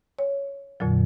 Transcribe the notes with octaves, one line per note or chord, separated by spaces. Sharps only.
C#5
F2 A#2 D3 F#3